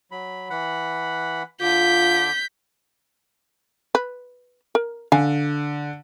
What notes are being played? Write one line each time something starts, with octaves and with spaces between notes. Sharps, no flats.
F#3 B5
E3 F#5 B5
D3 F4 D6 G6 B6
B4
A#4
D3 F5 G#5